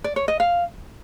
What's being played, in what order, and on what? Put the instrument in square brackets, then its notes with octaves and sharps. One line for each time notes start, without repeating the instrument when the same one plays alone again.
[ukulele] D5
C#5
D#5
F5